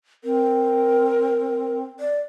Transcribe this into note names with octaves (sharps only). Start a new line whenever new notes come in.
C4 A#4
D5